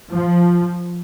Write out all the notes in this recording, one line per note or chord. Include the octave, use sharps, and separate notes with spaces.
F3